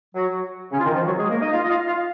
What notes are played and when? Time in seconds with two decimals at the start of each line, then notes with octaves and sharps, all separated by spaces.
0.15 F#3 F#4
0.72 C#3 C#4
0.79 F4
0.84 D#3 D#4
0.94 F3 F4
1.06 F#3 F#4
1.18 G#3 G#4
1.30 A#3 A#4
1.41 D#4 D#5
1.52 F4 F5
1.62 D#5
1.69 F4 F5
1.86 F4 F5